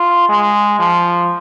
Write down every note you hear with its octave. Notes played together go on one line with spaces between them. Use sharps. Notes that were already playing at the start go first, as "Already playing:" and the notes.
Already playing: F4
G#3
F3